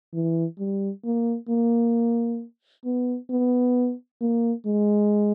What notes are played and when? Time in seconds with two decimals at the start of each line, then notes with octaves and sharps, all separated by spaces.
0.13 E3
0.59 G3
1.04 A#3
1.49 A#3
2.85 B3
3.30 B3
4.21 A#3
4.66 G#3